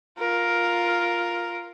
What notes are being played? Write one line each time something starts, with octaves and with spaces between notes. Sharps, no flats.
F4 A#4